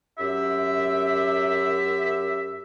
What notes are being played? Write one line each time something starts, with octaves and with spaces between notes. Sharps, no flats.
F#2 G4 E5